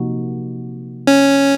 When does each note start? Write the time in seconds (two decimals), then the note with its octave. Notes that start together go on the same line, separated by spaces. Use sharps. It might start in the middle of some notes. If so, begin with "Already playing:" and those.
Already playing: C3 F3 A#3 D#4 F#4
1.07 C#4